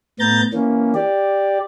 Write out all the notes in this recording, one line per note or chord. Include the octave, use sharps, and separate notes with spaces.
A2 B3 A#5 G6 A6
E3 A#3 C#4
G4 D5